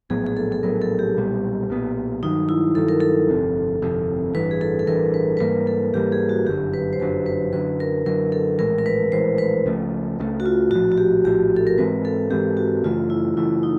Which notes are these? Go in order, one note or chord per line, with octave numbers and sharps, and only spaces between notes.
A#1 A2 F#3 B3 G#4
G#4
A4
A4
A#1 A2 F#3 B3 A#4
A4
G4
B1 A#2 G3 B3
B1 A#2 G3 B3
G2 D#3 F#3 D#4
E4
G2 D#3 F#3 A4
A#4
A4
G1 F2 C3
G1 F2 C3
A1 G2 E3 B4
G#4
A4
A4
A1 G2 E3 A#4
B4
B4
G#2 E3 G3 A#3 A#4
A4
G#2 E3 G3 A#3 G4
G#4
F#4
G1 F#2 D3 F#3 G4
B4
C5
G1 F#2 D3 F#3 B4
B4
F#2 D3 F#3 B4
A#4
F#2 D3 F#3 A#4
A4
A#1 A2 E3 G#3 A#4
A#4
B4
A#1 A2 E3 G#3 C5
B4
C#2 C#3 F3 A3
C#2 C#3 F3 A3
F#4
F4
A#1 A2 F3 F#4
F#4
G4
A#1 A2 F3 G4
A4
A#4
G#2 E3 G#3 C4 B4
A4
G#2 E3 G#3 C4 G4
F#4
F#2 C#3 E3 A3 F4
E4
F#2 C#3 E3 A3 E4
D#4